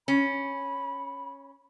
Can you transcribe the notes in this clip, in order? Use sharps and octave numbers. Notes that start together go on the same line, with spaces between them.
C#4 B5